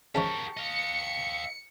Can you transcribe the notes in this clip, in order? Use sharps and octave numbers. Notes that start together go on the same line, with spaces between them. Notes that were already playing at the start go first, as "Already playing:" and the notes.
C#3 F3 G#3 G4 A#4 A5 C#6
D#5 F5 C#7